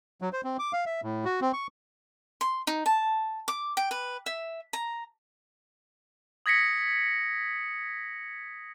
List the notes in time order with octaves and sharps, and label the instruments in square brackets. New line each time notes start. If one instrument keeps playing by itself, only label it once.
[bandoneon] F#3
C5
C4
D6
F5
E5
A2
F#4
C4
C#6
[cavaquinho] C6
D#4
A5
D6
G5
B4
E5
A#5
[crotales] D#6 G#6 A#6 B6 C#7